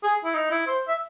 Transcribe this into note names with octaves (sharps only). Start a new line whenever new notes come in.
G#4
E4
D#4
E4
C5
E5